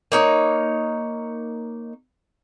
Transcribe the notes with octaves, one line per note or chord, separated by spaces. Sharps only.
A#3 D#4 C#5